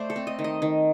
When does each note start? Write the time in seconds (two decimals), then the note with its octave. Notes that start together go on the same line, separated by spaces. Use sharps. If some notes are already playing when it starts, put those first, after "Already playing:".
Already playing: A3 C5 D5
0.10 A4
0.16 C4
0.27 D#5
0.39 D#3
0.44 D#5
0.62 D#3